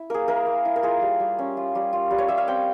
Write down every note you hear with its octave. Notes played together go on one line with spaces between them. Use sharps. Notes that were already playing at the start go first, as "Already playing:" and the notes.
Already playing: E4
A#3 G#4 A#4
E4 A#4
A#3
E4
A#4
F4 G#4
G3
G3
C#4
F4
G3
F4
G3
C#5
G3 E5
F5
C4 G5